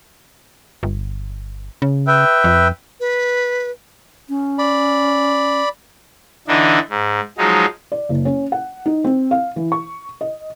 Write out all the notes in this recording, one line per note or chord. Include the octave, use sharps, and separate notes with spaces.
G1
C#3
B4 E5 G5
F2
B4
C#4
D5 B5
D3 E3 D4 D#4
G#2
F3 F#3 G#3 D#4
D5
F#1
C#4
F#5
D#4
C4
F5
E3
C#6
D#5